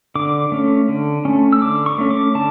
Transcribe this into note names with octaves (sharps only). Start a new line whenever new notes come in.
D3 D6
A3 C#4
D3
A3 C#4
E6
D3 D6
C#6
A3 C#4
D6
D3 A5